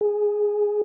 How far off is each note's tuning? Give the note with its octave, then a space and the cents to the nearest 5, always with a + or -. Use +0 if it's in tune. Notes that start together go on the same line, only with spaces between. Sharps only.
G#4 +0